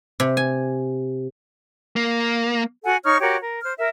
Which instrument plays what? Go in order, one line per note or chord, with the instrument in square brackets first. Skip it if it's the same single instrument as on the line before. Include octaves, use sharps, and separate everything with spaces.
[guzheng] C3
G#5
[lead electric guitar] A#3
[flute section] F#4 A4 F#5 G#5
D#4 C#5 C#6 F6
F#4 G4 A#4 C#5
A#4
C5 F6
A#4 E5